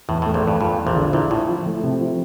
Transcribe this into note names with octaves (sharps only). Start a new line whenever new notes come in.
E2 A2
A2 A3
A#1 A#2
E2 G2
G2 F4
F4
A#1 A#2
D3
A#1 A#2 E4
A2 E4
F3
A3
C3
F3